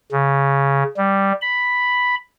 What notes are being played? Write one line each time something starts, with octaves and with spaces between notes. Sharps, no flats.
C#3
G3
B5